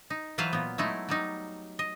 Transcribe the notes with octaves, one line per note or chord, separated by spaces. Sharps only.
D#4
E3 F#3 F4 B4 C5 F5
A#2 B3
F#3 G#3 A3 D#4 E4
F#3 G3 D#4
D#5